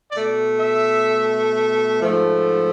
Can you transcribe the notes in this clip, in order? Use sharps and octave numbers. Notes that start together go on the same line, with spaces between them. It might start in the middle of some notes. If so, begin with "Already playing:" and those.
B2 A3 D5
E5
G#2 F3 A3